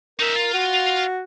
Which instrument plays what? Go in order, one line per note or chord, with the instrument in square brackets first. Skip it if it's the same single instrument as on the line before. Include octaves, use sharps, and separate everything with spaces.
[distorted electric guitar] D#4 E5 [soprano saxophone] A#4
[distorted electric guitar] F4
[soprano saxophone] F#4